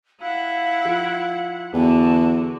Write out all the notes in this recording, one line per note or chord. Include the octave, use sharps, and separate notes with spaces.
E4 F5 F#5
F3
E2 D3 B3 F#4 G5 A5